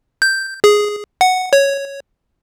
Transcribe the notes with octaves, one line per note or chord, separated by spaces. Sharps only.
G6
G#4
F#5
C#5